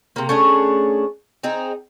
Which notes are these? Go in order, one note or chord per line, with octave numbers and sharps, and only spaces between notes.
C3 A#3
A3 C#4 D4 G#4
C4 D#4 G#4